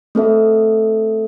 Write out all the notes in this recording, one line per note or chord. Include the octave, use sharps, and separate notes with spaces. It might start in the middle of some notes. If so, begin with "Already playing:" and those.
A3 C4 A4 E5